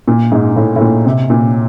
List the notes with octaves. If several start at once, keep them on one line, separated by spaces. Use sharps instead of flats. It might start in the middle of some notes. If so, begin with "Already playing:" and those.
A#2
G#2
A2
A2
A#2
C3
A#2